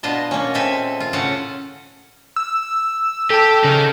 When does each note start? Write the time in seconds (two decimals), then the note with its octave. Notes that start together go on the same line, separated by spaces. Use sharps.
0.03 B2 D4 F4 D#5 A5
0.31 A#3 C#4
0.54 A#2 G#3 C4 A4 E5 G#5
1.00 F4
1.13 A2 C#3 C#4 A4 F5 F#5
2.36 E6
3.30 G4 A4 A5
3.64 C#3 D#4 A#4